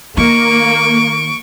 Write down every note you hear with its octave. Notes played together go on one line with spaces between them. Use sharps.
D#3 A#3 C#6 D7